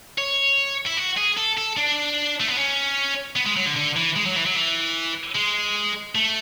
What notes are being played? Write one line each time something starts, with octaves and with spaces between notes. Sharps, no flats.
C#5
E4
F#4
G#4
A4
A4
D4
A3
B3
C#4
B3
G#3
F#3
D3
D3
E3
G#3
F#3
E3
F#3
E3
G#3
A3